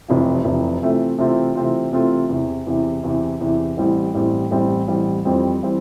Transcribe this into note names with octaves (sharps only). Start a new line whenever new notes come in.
F1 F2 C3 E3
F1 F2 C3 E3
C3 E3 A3 C4 F4
C3 E3 A3 C4 F4
C3 E3 A3 C4 F4
C3 E3 A3 C4 F4
E2 C3 E3
E2 C3 E3
E2 C3 E3
E2 C3 E3
A1 A2 E3 G3 C4
A1 A2 E3 G3 C4
A1 A2 E3 G3 C4
A1 A2 E3 G3 C4
F2 E3 G3 C4
E3 G3 C4